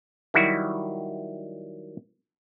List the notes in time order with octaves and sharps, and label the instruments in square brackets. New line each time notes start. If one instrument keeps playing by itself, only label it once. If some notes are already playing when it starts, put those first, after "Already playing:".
[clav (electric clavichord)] D#3 F#3 G3 E4 F#4